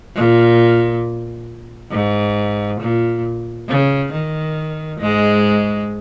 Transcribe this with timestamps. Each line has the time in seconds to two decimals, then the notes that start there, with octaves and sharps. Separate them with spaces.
0.15 A#2
1.91 G#2
2.81 A#2
3.68 C#3
4.13 D#3
5.00 G#2 G#3